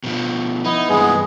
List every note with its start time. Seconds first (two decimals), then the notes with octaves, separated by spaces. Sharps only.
0.04 B2 F3
0.65 B3 D#4 E4
0.89 G2 E3 G#3 B3 G#4